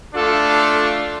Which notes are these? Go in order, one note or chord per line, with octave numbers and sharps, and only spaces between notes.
A3 D4 F4 A4